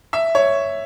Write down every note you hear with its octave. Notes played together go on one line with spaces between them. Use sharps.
E5
C#5